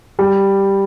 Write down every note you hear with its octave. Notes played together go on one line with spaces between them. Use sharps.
G3